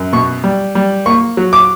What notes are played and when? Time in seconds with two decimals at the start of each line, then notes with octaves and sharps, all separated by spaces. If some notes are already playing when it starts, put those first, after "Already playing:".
Already playing: F#2
0.13 B2 C#6
0.44 G3
0.75 G3
1.06 A#3 C#6
1.37 F#3
1.53 D6